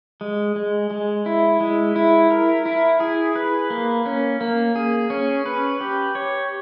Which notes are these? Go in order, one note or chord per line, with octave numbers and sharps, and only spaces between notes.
G#3
G#3
G#3
E4
G#3
E4
A#4
E4
G#4
B4
A#3
C#4
A#3
G#4
C#4
B4
G4
C#5